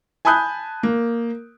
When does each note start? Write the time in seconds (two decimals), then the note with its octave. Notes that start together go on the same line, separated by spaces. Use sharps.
0.25 G#5 A5 B5 D#6 F#6 G6
0.83 A#3